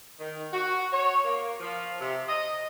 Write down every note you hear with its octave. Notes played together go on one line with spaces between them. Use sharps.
D#3
F#4
C#5
A#3
F3
C3
D#5